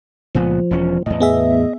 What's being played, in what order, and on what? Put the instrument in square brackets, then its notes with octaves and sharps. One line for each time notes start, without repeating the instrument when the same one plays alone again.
[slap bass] C#2 A#2 B3 [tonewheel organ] F3
[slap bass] E1 E2 C#4
[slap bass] E2 A2 [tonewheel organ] D#5
[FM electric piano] B3 G#4 E5